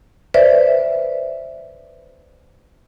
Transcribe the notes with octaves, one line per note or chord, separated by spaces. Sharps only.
B4 C5 D5 E5